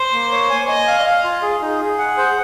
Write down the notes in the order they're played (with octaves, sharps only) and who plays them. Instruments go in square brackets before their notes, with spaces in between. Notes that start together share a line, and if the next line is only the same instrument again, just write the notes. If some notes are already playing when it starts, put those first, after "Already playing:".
Already playing: [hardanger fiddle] C5
[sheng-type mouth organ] A#3
C#5
G#5
[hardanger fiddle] D#5 [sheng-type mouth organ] G#5
[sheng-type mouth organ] F5
F5
F4
G#4
D#4
G#4
F#5
C5